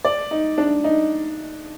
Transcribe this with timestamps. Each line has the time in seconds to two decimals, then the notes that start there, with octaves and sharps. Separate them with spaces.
0.05 D5
0.31 D#4
0.58 D4
0.84 D#4